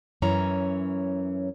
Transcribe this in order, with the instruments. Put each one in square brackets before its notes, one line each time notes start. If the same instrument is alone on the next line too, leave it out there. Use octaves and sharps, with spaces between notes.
[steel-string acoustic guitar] F#2 E3 C#4 C#5 A#5